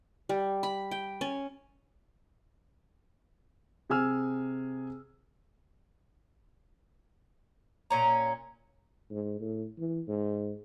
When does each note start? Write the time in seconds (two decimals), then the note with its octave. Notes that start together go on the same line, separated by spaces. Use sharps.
0.29 G3
0.63 B5
0.91 G5
1.21 C#4
3.90 C3 G#4 G#5 E6 F6
7.90 A#2 C#4 A#5
9.11 G#2
9.40 A2
9.79 E3
10.08 G#2